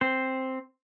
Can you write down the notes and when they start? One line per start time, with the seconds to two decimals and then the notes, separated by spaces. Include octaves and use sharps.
0.01 C4 C5